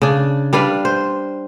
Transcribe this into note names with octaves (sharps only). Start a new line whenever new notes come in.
C#3 D4
G3 D4 B4 F5
C5